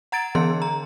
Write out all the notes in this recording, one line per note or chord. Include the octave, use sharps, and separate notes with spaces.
F#5 A#5 G#6 A6 D7
D3 E3 B3 G#4 C6
A#5